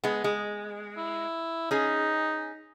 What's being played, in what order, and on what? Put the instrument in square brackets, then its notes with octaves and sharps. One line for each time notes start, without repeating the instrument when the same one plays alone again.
[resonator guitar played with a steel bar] G#3 B3
G#3
[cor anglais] E4
[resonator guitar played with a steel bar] C#4 G#4 [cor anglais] D#4